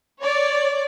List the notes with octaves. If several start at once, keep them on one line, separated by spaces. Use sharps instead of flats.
C#5 D5